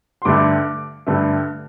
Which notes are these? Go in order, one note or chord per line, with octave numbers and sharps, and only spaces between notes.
C6
G2 D3 A3 D6
G2 D3 A3